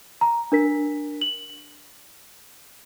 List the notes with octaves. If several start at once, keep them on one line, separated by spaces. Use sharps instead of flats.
A#5
D4 A#4 B6
F#7